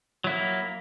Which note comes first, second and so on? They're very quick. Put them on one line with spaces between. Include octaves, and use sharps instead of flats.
F#3 E4 A#3